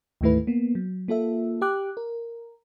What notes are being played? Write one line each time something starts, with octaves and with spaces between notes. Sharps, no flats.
D2 G#2 D#3 A3 E4 B4
A#3 B3
F#3
A#3 F4 A4 E5
G4 G5 D6 F#6
A#4